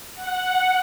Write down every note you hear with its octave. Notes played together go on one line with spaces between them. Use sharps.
F#5